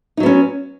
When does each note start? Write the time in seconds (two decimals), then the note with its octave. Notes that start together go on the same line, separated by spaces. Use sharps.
0.17 D#4
0.20 F#3
0.23 B3
0.26 C#4